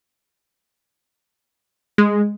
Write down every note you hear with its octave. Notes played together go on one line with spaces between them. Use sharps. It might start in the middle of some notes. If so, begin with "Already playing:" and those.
G#3